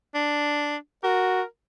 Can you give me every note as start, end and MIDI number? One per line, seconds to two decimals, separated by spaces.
0.15 0.76 62
1.03 1.42 66
1.03 1.45 70